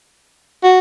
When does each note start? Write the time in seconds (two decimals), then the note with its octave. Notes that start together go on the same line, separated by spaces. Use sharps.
0.63 F#4